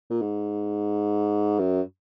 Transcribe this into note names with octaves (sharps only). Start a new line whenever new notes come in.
A#2
G#2
F#2